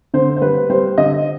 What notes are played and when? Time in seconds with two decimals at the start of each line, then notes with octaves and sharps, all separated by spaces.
0.14 D3 C5
0.37 C5
0.41 G3 B4
0.70 G3 C5
0.98 D3 D#5